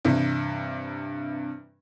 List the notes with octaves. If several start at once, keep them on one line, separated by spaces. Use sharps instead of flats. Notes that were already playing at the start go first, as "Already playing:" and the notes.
G2 C3 E3